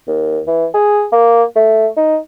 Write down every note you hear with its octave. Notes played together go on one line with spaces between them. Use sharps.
D#2
E3
G#4
A#3
A3
D#4